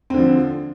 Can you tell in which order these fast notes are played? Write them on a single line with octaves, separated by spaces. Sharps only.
C4 D3 F3